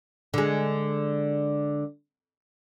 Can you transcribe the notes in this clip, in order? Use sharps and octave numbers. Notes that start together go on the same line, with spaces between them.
D3 G#3